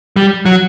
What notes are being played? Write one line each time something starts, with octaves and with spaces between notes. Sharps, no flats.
G3
F#3